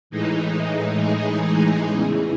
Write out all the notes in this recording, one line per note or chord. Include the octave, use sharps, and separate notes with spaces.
A2 E3 G#3 D#4
G#4
E2 C#3 E3